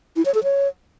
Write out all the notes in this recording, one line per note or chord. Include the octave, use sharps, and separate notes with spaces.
E4
C#5
A4
C#5